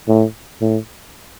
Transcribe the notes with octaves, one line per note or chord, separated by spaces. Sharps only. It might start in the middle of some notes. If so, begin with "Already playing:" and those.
A2
A2